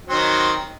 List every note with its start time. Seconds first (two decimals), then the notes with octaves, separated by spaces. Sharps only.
0.06 F#3
0.09 C4
0.12 D#3